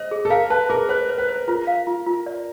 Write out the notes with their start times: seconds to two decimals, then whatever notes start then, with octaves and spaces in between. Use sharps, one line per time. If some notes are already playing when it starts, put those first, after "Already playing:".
Already playing: C5 D#5
0.11 G#4
0.25 A4
0.30 A#4 F5
0.50 B4 A5
0.69 G#4 A#4
0.89 B4 C5
1.09 C5
1.18 B4
1.28 C5
1.48 F4 A#4
1.67 F5
1.87 F4
2.06 F4
2.26 D5